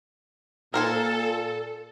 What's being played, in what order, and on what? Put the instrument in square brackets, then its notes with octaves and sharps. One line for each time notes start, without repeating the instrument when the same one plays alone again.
[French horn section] A#2 [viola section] A4 [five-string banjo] A#4 C5 G#5